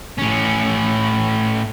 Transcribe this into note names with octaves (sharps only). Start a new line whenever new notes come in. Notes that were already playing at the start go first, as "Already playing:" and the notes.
A2 C#4